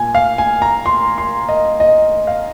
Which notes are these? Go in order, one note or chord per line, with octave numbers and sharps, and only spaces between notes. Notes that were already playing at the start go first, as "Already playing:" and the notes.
Already playing: A#2 A#3 G#5
F5
G#5
A#5
C6
C6
D#5
D#5
F5